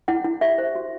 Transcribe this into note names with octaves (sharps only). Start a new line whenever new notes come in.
E4 F#5
E4
G4 E5
C5
F#4